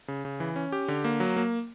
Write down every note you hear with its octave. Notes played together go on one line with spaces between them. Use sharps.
C#3
C#3
E3
C#4
G4
D3
A#3
F#3
A#3